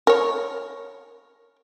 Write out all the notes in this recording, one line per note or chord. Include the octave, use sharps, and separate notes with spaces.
A#4 C#5